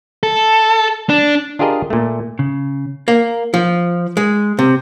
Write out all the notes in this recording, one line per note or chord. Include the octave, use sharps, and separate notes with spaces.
A4
D4
D4 F4 G4 G#4 A#4 D#5
A#2 A3
C#3
A#3
F3
G#3
C3